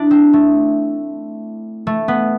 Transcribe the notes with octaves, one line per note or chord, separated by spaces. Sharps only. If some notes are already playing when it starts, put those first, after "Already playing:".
Already playing: D4 E4
C4
A3
A3
B3